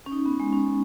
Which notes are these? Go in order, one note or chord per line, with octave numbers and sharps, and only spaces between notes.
C#4
D#4
B3
G#3
C#4